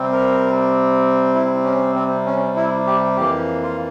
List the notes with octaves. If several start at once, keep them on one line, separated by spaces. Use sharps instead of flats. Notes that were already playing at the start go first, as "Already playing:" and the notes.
Already playing: C3 G3 C4
A#4
E4
C#4
C4
C#4
E4
G4
F2 E3 A#3 G4
F4